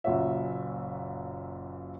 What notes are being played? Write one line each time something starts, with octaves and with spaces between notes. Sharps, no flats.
F#1 F#2 A#2 F#4 C#5 E5